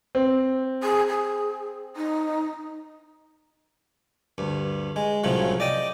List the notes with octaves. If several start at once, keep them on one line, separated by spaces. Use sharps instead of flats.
C4
G#4
G#4
D#4
D2 G2
G#3
C2 A2 C#3 F3 F#3
D5 D#5 G5 D#6